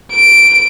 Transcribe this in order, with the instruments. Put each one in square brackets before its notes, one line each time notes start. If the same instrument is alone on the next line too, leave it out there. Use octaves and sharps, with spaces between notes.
[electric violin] D7